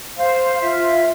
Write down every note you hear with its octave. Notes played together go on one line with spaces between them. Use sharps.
C5 F5
F4 E5